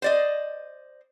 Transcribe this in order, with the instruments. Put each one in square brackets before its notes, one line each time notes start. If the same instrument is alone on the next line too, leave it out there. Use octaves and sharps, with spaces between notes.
[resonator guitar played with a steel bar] C5 D5 D#5